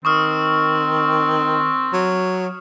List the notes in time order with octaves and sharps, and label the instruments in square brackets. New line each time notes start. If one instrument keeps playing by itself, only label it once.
[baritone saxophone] D#3 [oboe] C4 [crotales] C#6 D#6 F6
[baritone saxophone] F#3